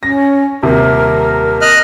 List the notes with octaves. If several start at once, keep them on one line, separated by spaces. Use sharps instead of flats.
C#4 A#6
D#1 C3 A#4
D#5 F6 F#6